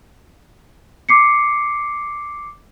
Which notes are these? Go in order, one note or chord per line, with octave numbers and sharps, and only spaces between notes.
D6 C7 C#7